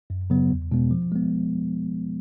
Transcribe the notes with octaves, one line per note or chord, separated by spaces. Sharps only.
F#2
C#3 F#3 B3
E2
B2 G#3 B3
F3
G#3 B3